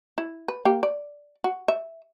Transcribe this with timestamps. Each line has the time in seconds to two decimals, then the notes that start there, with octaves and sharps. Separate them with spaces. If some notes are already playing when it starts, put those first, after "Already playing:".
0.18 E4
0.48 B4
0.65 A#3 G4
0.83 D5
1.44 F#4
1.68 E5